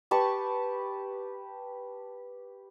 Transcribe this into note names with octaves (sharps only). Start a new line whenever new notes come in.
G4 B4 A5 C#6